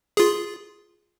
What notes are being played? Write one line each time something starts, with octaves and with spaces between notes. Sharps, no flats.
F4 G#4